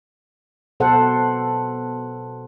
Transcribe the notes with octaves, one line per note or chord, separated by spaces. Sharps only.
B2 A4 C5 F#5